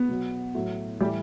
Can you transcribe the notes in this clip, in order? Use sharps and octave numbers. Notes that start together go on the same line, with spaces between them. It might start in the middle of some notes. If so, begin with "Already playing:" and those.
Already playing: B3
B2 F#3
A2 F#3
A2 E3 G3 G4